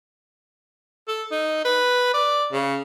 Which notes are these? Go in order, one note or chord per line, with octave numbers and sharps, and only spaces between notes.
A4
D#4
B4
D5
C#3